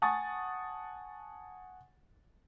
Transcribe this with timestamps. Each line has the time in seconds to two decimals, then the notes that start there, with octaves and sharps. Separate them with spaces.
0.02 F#5 G#5 A5 C#6 D#6 A6